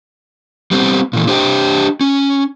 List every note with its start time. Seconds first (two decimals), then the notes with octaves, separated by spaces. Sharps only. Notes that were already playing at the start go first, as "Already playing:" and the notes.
0.71 G3 B3 C4
1.13 A#2 E3
1.27 D4 G4 C5 D5 D#5 G5
2.01 C#4